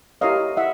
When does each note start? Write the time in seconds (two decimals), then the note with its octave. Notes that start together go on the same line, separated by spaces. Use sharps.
0.21 E4 G4 A#4 C#5 D#5 F5
0.57 E4 E5 F#5